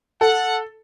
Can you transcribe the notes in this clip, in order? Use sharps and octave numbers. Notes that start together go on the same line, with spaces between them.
A4 F#5